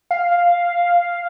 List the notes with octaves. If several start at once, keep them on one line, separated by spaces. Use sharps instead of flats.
F5